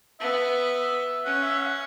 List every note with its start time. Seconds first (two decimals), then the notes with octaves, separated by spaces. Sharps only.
0.20 B3 E5
1.25 C#4 F#5
1.43 E5
1.60 F#5